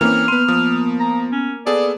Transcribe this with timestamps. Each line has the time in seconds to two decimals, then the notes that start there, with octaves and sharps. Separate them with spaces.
0.01 E3 A#3 C4 C#4 F6
0.28 B3 B4 C6
0.48 F3 D#6
1.00 A#5
1.32 C#4
1.66 B3 G#4 A4 D5